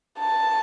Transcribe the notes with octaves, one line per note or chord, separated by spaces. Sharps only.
A5